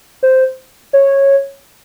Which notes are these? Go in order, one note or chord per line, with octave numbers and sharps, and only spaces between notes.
C5
C#5